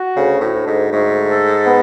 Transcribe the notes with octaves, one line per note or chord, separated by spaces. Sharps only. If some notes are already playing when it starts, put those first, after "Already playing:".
Already playing: F#4
D2 C#3
A2
D2
G#2
G#2 A3
A4
B3